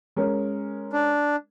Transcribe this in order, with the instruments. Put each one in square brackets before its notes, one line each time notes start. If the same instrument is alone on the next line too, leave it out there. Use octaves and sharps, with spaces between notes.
[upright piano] G#3 C#4 A#4
[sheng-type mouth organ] D4